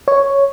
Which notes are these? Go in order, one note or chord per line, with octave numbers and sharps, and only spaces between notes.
C#5